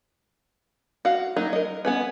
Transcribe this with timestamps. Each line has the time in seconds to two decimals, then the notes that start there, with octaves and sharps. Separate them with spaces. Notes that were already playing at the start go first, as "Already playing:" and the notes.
1.05 F#4 F5
1.36 F#3 A#3 D#4
1.53 A#4 D#5
1.85 B3 C#4 B4